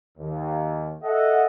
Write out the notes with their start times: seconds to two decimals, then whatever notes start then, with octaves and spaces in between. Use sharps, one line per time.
0.18 D#2
1.03 A4 D#5 E5 F#5